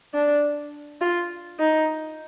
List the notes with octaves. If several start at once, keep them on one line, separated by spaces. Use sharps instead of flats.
D4
F4
D#4